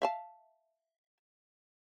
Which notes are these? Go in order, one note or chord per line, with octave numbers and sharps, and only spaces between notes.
E5 F5 A5